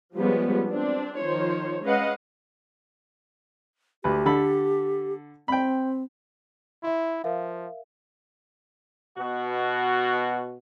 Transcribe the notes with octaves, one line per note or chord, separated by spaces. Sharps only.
F3 G3 G#3 B3 C#4
C4 D4
D#3 F3 C5 C#5
G#3 C#4 B4 D#5 F5 F#5
D2 G4 B4
D3 A4 B5
C4 G5 B5
E4 E5 C6
F3 A#4 E5 F5
B2 F#4